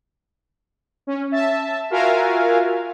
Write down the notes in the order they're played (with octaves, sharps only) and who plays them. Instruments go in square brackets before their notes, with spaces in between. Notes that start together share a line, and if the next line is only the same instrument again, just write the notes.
[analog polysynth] C#4
E5 A5
F4 F#4 A#4 E5 F5 G#5